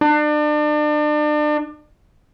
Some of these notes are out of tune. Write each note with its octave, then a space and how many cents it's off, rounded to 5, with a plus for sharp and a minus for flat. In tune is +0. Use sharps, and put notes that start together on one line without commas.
D4 +35